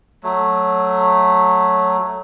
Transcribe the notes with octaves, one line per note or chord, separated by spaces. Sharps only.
F#3 A3